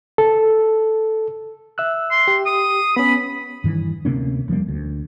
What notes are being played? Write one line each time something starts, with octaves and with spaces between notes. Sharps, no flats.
A4
E5 E6 F#6
C6
G4
D#6
B3 C#4 B5
G2 D#3 E3
D2 C3 A#3 C#4
E1 F3 G3 A#3
D2